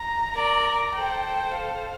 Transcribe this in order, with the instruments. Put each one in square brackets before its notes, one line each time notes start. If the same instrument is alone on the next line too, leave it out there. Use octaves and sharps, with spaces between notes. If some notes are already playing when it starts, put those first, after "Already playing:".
Already playing: [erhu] A#5
[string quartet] A#4 D5
[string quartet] A4 C5 [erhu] G5
[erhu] G5
F5